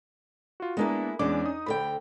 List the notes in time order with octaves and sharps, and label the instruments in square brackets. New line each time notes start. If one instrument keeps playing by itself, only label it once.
[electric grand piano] F4 F#4
[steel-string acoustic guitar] G#3 A#3 E4 [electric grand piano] B3 D4
[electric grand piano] E2 G#3 D6 [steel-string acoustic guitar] C#4 D4
[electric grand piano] D#4 D#6
[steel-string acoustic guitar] D2 D3 G5 [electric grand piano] B5